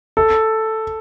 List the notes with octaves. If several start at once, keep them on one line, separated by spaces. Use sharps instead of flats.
A4